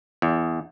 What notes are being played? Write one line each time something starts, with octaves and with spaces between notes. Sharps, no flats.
E2